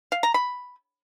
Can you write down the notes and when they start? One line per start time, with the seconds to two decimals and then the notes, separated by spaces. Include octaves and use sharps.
0.12 F5
0.23 A#5
0.34 B5